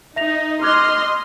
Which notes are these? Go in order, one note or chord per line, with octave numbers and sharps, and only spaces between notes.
D#4 E5 A#6 F7
D#5 C6 D6 F6 F#6 G#6